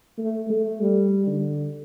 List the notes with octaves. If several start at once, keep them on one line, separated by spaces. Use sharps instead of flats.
A3
A3
G3
D3